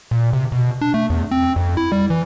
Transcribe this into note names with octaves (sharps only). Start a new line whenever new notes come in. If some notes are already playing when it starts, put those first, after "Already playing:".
A#2
C3
B2
D4
A3
E2
C4
F2
E4
G3
E3